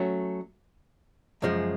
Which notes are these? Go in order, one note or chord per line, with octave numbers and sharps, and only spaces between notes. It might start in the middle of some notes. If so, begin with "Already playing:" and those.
Already playing: F#3 A3 C#4
F#2 C#3 F3 G#3